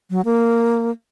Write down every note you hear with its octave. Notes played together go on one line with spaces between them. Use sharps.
F#3
A#3